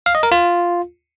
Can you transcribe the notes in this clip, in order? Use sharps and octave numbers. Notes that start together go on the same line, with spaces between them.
F5
D#5
A#4
F4